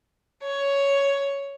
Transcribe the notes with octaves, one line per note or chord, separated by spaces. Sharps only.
C#5